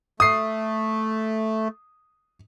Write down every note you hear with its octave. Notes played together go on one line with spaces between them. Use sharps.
A3 D#6 C7